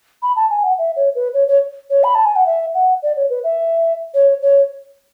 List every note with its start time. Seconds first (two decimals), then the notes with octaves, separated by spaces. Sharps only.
0.22 B5
0.36 A5
0.50 G#5
0.63 F#5
0.78 E5
0.96 C#5
1.15 B4
1.34 C#5
1.48 C#5
1.90 C#5
2.04 B5
2.15 A5
2.25 G#5
2.36 F#5
2.46 E5
2.74 F#5
3.03 D5
3.16 C#5
3.30 B4
3.44 E5
4.14 C#5
4.42 C#5